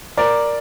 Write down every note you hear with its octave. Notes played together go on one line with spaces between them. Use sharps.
A#4 D5